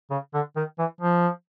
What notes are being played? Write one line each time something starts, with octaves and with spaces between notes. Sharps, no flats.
C#3
D3
D#3
E3
F3